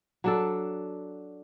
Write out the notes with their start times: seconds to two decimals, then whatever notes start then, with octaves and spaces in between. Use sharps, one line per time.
0.24 F#3 D4 A4